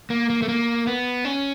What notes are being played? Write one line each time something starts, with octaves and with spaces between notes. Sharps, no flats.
A#3
A#3
A3
A#3
B3
C#4